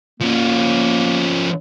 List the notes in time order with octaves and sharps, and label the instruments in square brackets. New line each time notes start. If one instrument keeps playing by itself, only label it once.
[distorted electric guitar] F3 C#4 [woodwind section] A#3